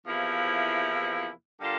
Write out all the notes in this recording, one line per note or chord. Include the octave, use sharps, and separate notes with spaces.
E2 C3 F3 A#3 E4
D3 G3 A#3 F4 A4